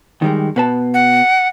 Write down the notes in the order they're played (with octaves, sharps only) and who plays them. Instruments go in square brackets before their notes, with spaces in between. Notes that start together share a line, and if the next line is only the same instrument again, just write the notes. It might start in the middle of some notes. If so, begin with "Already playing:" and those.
[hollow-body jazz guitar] D#3 G3 G#3
B2 B4 A5
[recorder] F#5